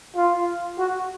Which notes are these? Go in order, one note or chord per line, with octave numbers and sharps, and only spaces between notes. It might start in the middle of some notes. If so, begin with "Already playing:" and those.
F4
F#4